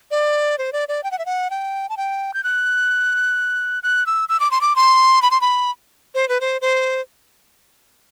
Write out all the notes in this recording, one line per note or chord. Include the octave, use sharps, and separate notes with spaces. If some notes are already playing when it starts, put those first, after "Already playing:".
D5
C5
D5
D5
G5
F#5
E5
F#5
G5
A5
G5
G6
F#6
F#6
E6
E6
D6
C6
D6
C6
B5
C6
B5
C5
B4
C5
C5